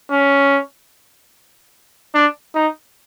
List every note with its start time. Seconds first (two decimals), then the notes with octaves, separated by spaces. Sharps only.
0.11 C#4
2.15 D4
2.55 D#4